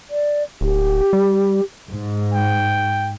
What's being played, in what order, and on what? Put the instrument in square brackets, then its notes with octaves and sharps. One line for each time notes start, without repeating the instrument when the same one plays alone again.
[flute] D5
[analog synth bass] D1 [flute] G4
[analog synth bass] G3
[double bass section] G#2
[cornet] G5